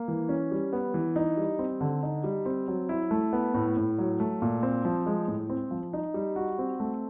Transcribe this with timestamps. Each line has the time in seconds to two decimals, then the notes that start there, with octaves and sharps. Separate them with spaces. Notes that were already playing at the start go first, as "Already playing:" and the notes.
Already playing: A#3
0.08 E3
0.29 C#4
0.51 G3
0.73 B3
0.94 E3
1.16 D#4
1.37 G3
1.59 C4
1.81 D3
2.03 D#4
2.24 G3
2.46 C4
2.68 F#3
2.89 E4
3.11 A3
3.33 B3
3.54 A2
3.77 A2
3.98 F#3
4.20 A3
4.42 A#2
4.63 C4
4.85 F3
5.06 G#3
5.28 A2
5.50 C4
5.71 F3
5.93 D#4
6.14 G3
6.36 F#4
6.59 C4
6.80 A3